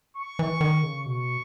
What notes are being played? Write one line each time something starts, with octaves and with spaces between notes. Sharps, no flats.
C#6
E3
D#3
C#3
B2 C#6